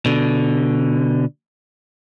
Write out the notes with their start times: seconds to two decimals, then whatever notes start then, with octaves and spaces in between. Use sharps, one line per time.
0.06 B2 D3